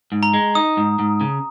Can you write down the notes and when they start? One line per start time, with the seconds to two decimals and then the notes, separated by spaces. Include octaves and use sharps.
0.12 G#2
0.23 A#5
0.33 G#3
0.55 D#4 D#6
0.77 G#2
0.99 G#2
1.21 C#3